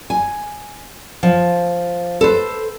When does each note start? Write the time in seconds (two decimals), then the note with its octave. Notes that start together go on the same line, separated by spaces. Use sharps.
0.10 G#5
1.23 F3
2.21 A4 B4 C5